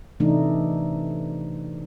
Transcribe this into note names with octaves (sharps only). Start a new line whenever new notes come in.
C3 E3 A3 D4 D#4